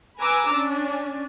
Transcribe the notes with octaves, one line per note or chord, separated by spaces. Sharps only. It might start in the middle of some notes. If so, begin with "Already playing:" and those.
B4 G#5 A#5 D6 E6
C#4 D4